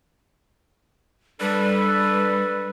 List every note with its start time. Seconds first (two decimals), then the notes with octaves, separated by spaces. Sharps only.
1.40 G3 D4 A4 B4